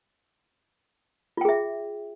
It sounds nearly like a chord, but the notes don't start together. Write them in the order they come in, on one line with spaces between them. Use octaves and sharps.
F4 G5 G#4 E5